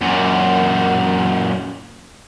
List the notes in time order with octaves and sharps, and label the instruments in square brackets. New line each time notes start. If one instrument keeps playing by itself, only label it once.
[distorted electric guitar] F#2 A#2